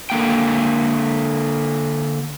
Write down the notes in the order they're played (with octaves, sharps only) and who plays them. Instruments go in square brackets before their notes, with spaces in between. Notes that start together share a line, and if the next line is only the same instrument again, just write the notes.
[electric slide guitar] D3 A#3 G5